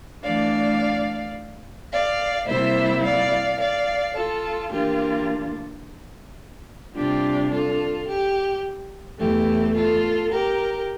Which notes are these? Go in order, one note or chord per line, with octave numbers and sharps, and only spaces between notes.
E3 A3 D4 D5 F5
D5 F5
C3 G3 A#3 E4 C5 E5
D5 F5
D5 F5
F4 A4
E3 A#3 D4 F4 G4 A#4
C3 G3 D4 F4 G4
F4 A4
G4
E2 E3 A3 G4
F4 A4
G4 A#4